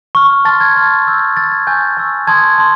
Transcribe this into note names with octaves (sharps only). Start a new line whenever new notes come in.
C#6 F6
A5 C6 F6 A6
G#6
A5 C6 F6
C6 E6 G6
C6 E6 G6 A6
G#6
G#5 C#6 E6 G6
G#5 C#6 E6
A5 C6 D#6 G#6
A5 C6